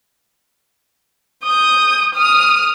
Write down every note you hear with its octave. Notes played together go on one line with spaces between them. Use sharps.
D#6 G6
D#6 F6